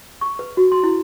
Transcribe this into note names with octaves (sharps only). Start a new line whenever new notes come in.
C#6
B4
F#4
C6
E4